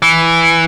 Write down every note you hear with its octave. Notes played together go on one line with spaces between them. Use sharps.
E3